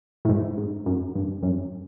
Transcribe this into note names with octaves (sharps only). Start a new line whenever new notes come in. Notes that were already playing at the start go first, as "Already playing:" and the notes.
A2
G#2
G#2
F#2
G2
F#2